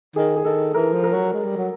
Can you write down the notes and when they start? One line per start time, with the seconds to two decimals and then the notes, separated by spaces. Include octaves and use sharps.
0.16 D#3 G#4
0.36 G#4
0.45 D#3 A4
0.74 E3 A#4
0.93 F3
1.04 A#4
1.13 F#3
1.33 G#3
1.45 G3
1.57 F#3